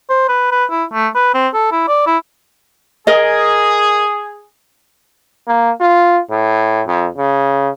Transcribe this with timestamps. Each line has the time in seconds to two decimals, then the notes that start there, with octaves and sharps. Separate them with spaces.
0.09 C5
0.28 B4
0.51 B4
0.70 E4
0.93 A3
1.15 B4
1.34 C4
1.54 A4
1.72 E4
1.88 D5
2.06 E4
3.07 G#4 A#4 D#5
5.47 A#3
5.81 F4
6.30 A2
6.87 F2
7.17 C#3